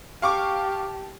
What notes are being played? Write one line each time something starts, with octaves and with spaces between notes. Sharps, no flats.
G4 F5 A5 C#6 D6